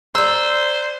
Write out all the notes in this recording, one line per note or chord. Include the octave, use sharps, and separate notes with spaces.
C5 D5 A#5 E6